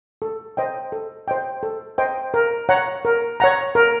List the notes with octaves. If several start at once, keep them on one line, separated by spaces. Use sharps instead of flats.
A4
C5 D#5 G5
A4
C5 D#5 G5
A4
C5 D#5 G5
A#4
C#5 F#5 A#5
A#4
C#5 F#5 A#5
A#4